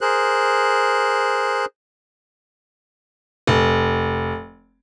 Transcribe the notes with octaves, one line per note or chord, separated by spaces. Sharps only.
G#4 A#4 C5 F#6
F1